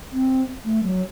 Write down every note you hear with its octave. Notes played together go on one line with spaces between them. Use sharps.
C4
A3
F#3